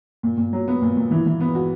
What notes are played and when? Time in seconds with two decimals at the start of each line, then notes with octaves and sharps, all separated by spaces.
0.23 A#2
0.38 A#2
0.53 F#3
0.68 B3
0.82 A#2
0.97 A#2
1.11 E3
1.26 E3
1.40 B3
1.55 F#4